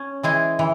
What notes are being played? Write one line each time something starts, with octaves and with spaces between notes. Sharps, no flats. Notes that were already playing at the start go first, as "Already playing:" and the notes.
Already playing: C#4
E3 G#3 E4 G#4
E3